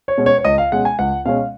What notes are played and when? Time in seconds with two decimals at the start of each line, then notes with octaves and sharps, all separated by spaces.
0.08 C#5
0.18 B2 G#3 C#4
0.26 C#5
0.38 C#5
0.45 C#2 D#5
0.58 F5
0.72 B2 G#3 C#4 F#5
0.85 G#5
0.99 C#2 F#5
1.26 B2 G#3 C#4 F5